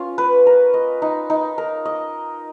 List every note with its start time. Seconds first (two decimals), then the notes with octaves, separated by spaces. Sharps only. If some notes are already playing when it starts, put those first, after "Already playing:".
Already playing: C#4 F4
0.18 B4
0.47 A#4
0.74 D#5
1.02 D#4
1.30 D#4
1.58 A#4
1.85 D#5